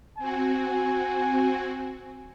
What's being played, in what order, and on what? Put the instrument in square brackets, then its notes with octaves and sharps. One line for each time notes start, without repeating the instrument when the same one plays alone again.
[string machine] C4 F#4 [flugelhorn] G#5